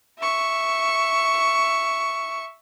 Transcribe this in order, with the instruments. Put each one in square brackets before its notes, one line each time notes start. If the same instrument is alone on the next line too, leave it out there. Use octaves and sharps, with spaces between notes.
[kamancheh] E5 C#6